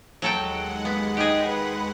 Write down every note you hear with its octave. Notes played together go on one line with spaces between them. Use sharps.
D#2 F#3 G#3 A4 F#5 G5
B3
D#4 G4 G#4
B4